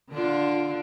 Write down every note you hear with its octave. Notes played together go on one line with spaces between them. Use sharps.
D3 D4 F4